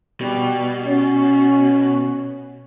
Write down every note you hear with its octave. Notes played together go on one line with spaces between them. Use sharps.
B2 G3
C#4